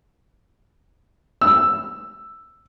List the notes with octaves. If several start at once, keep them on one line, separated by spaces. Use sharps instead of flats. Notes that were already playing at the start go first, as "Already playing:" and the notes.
E6